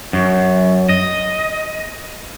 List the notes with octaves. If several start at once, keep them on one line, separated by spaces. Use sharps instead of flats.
F#2
D#5